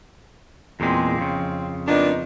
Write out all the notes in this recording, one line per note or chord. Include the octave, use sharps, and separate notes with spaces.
E2 A#2 G#3 C4
F2 C#3
A#2 B3 D4 D#4